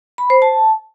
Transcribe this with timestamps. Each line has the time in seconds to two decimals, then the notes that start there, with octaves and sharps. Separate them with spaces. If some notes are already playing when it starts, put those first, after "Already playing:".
0.18 B5
0.30 C5
0.42 A5